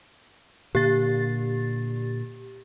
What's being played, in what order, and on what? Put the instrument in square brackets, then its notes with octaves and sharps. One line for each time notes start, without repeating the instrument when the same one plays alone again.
[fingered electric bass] A#2 D3 A#3 [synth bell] G4 A6